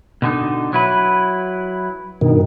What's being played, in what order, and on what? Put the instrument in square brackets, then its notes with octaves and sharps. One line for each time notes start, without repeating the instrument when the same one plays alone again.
[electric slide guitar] B2 D3 D#4
F#3 E4 B4
[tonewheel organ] G2 B2 D#3